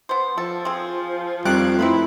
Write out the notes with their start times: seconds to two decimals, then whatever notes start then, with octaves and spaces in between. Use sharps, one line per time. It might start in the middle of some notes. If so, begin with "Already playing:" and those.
0.09 B3 C5
0.38 F3 A4
0.65 C4 G#4
1.45 F2 D#3 G3 A3 F#6 D7
1.79 A3 C4 D#4 E4 B4